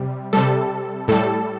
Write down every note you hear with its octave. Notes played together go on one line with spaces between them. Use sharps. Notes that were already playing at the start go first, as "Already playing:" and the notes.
Already playing: C3 G3
C3 G3 A4
A2 G3 A4